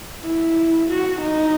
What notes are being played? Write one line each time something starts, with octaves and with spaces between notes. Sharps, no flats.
E4
F#4
D#4